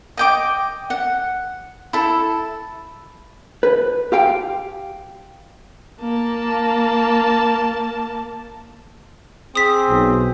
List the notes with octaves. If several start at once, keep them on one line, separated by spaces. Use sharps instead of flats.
D#5 G5 D6
F#5
E4 A4
B4
G4 F5 G5
A#3 A5
C4 G#4 D#6 B6
B1